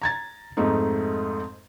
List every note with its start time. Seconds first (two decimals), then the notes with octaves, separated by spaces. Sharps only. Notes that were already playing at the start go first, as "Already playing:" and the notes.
0.02 A#5 G#6 A6
0.57 F2 G#2 A3 D#4